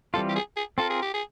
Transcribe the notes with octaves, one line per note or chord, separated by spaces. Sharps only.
E3 G3 C4 F4 A4
G4
G#4
G#4
C4 F4 A4 A#4
G#4
G4
G#4